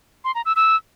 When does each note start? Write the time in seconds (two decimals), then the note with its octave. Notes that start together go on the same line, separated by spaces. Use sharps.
0.24 C6
0.35 A#5
0.45 E6
0.56 E6